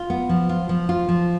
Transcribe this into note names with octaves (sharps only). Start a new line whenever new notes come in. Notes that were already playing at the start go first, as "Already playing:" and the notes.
Already playing: F4
B3
F3
F4
F3
F4
F3